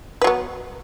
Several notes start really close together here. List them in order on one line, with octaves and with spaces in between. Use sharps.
B4 F#3 B3